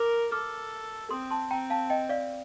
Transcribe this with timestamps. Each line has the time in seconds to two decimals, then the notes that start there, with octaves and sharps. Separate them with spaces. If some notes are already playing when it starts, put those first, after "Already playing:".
Already playing: A#4 D6 F6
0.32 A4 D6 F6
1.10 C4 C6 D#6
1.31 A5 C6
1.51 C4 G5 A#5
1.70 F5 A5
1.90 D#5 G5
2.09 D5 F5